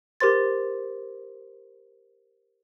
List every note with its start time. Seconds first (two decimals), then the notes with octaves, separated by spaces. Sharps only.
0.20 G4 A#4 C5 C6 A6